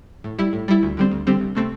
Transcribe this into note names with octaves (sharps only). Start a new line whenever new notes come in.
A2
G3 E4
A2
G3 E4
D2
D3 G3 C4
D2
D3 G3 C4
C2
C3 A3 C4